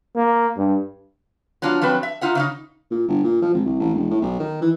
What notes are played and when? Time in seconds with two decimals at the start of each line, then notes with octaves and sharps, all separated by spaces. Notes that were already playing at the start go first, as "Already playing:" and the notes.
0.16 A#3
0.57 G2
1.62 F#3 B3 D4 F4
1.82 F3 F#3 C4 B4
2.03 E5
2.21 D#4 F4 E5 F#5
2.35 C#3 B3 D#4
2.91 A#2
3.08 G1
3.24 A#2
3.42 F3
3.55 G#1
3.66 C2
3.80 A1
3.95 E1
4.10 A2
4.22 B1
4.40 D#3
4.62 E3